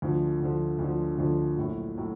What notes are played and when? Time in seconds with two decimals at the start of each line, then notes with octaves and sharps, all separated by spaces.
0.02 D2 D3 F3
0.40 D2 D3 F3
0.79 D2 D3 F3
1.18 D2 D3 F3
1.57 A#1 A2 F#3
1.97 A2 F#3